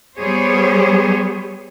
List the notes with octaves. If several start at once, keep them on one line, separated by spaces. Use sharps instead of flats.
G3 B3 G#4 C5 C#5